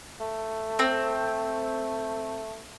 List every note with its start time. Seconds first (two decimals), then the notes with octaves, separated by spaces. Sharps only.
0.20 A3
0.79 C4